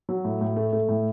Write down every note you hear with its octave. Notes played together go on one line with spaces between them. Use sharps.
F#3
A2
A2
A3
A3
A2